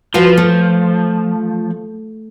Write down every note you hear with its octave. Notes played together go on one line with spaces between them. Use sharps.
F3 F4 F#4 B4
A3